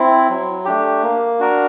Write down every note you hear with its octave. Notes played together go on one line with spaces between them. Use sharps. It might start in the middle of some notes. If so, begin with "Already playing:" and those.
Already playing: C4 E4
F#3
A3 D4 G4
A#3
D4 F#4 A#4